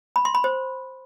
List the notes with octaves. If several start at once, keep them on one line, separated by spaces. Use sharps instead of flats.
B5
C6
B5
C5